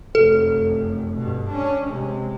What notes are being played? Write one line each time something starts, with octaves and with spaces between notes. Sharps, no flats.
F1 F#2 A4
G2 B2
C#4 D4
C3 G#3